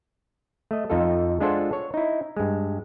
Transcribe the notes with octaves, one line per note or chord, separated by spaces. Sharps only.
A3 D#5
F2 D#4 F4 A4
G#3 D4 F4 A4 C5 F#5
C#5
D#4 E4
G2 G#3